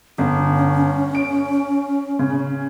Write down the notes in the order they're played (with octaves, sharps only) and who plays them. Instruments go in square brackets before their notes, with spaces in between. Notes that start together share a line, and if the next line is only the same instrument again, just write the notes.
[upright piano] G1 [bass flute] C#4
[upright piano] D7
C#3